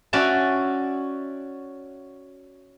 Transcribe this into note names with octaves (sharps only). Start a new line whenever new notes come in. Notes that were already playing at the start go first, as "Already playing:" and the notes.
C#4 F#4 D5 E5 A5